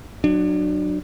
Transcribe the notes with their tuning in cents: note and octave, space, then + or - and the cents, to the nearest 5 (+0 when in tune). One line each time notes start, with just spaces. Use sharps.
F#3 +0 D4 +30